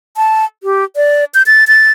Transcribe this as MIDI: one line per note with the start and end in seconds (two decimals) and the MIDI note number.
0.17 0.45 81
0.63 0.84 67
0.96 1.25 74
1.34 1.43 91
1.46 1.64 93
1.68 1.92 93